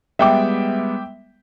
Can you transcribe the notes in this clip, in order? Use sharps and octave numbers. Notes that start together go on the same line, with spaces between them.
G3 G#3 B3 E5 G5 D6